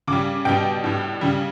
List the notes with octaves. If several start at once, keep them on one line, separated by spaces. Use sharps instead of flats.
C#3 G3 D6
B2 G3 G5
A2 G3
C#3 G3